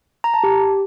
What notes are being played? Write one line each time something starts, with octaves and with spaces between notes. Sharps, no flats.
A#5
A5
G4